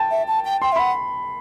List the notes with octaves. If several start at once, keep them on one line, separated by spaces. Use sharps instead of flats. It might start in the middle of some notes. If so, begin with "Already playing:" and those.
Already playing: G5 A5
E5
A5
G5
G5 C6
E5
F#5 B5